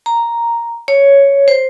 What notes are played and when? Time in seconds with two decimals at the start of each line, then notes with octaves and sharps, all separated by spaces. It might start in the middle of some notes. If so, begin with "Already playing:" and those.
0.06 A#5
0.88 C#5
1.48 C5